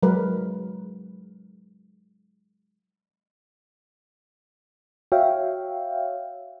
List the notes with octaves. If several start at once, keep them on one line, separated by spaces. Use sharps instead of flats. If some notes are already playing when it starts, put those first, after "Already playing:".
F#3 G#3 A#4 B4
F#4 C#5 E5 F5 G5